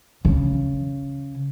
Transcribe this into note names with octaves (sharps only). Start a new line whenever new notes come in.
C#3